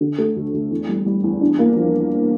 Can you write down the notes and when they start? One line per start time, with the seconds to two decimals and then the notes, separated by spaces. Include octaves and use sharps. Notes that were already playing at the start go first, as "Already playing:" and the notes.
0.01 D3
0.18 A3
0.36 D2
0.54 D2
0.71 E2
0.89 G3
1.06 G3
1.24 E2
1.41 D4
1.59 A#3
1.76 F3